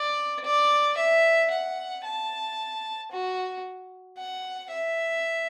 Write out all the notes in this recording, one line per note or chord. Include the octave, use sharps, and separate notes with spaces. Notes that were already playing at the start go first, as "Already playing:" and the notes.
Already playing: D5
D5
E5
F#5
A5
F#4
F#5
E5